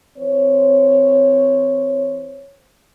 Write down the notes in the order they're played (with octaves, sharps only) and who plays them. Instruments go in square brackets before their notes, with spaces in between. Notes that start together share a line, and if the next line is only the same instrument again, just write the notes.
[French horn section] E3 C4 C5 C#5